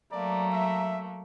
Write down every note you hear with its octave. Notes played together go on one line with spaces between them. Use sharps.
F#3 A3 A#3 D5 A#5
E5